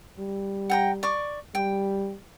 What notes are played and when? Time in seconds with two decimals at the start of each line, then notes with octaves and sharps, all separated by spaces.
0.19 G3
0.70 F#5 G5 A#5
1.03 D5 C#6 D6
1.55 G3 G5